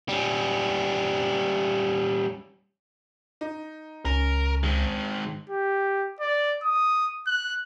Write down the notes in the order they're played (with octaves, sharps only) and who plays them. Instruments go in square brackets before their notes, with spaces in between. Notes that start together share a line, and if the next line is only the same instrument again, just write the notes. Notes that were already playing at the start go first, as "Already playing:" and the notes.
[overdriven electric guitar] G3 C#4
[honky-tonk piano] D#4
[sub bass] C#2 [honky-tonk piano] C#4 [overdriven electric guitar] A#4
[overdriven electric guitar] D#3 G#3
[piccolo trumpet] G4
D5
D#6
F#6